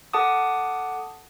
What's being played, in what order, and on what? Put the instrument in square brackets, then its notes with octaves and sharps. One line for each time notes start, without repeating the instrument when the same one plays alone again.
[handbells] A4 F#5 A5 D6 D#6